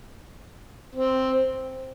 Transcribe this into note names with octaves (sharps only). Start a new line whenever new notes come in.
C4